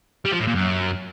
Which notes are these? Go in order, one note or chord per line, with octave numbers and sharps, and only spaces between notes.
G3
F3
A2
A#2
F#2